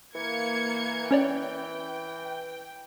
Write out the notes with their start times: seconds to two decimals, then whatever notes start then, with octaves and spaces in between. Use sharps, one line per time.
0.15 E3 A#3 G#6 C#7
1.11 C#4 C#5 D5 G5